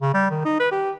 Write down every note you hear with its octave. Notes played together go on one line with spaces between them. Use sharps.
C#3
G3
D#3
D#4
B4
G4